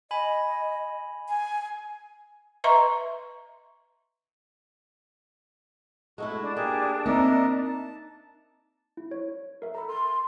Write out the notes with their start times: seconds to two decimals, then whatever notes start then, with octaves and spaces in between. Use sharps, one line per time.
0.11 D#5 G#5 B5
1.29 G#5
2.64 B4 D#5 E5 A#5 C6 C#6
6.18 G#3 A3 E4 F#4
6.42 D4
6.56 A#3 G4 G#4 G#5
7.06 A#3 C4 D#4 A#4 D#5 E5
7.64 A5
8.97 E4
9.11 C#5
9.62 A#4 E5
9.75 A4 A#5 B5
9.88 C6